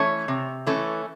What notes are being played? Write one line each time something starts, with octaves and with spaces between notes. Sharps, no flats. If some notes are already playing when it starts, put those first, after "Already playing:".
Already playing: E3 A3 C#4 C#5
C3
E3 A3 C#4